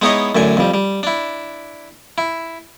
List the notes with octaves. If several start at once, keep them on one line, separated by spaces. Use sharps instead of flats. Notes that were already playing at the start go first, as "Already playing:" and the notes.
G#3 B3 D#4 E4 C#5 D#5
F#2 A2 D3 G#5
F2 G3
G3
D4 E4
E4